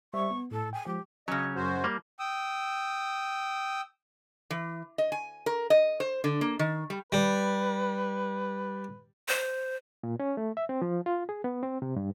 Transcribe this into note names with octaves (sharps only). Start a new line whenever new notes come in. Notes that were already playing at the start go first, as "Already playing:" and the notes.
G3 C5 E5 C#6
B3
A2 A4
G5 G#5
F3 G#3 G4
C#3 F#3 C#4 D#5
F#2 F#4 C5
G3 A#3
G5 D#6 E6
E3
D#5
G#5
A#4
D#5
C5
D3
A#3
D#3
G3
G3 B4
C5
A#2
C#4
A3
E5
C4
F3
F4
G#4
B3
C4
C3
G2